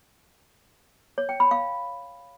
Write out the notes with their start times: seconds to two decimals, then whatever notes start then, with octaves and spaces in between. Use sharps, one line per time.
1.18 C#5
1.29 G5
1.40 B5
1.51 F5